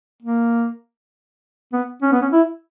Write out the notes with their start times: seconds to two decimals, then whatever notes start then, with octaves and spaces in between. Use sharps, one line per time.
0.23 A#3
1.73 B3
2.02 C#4
2.12 B3
2.22 C#4
2.32 E4